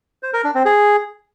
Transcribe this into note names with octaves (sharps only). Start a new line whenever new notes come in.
C5
A#4
D4
C4
G#4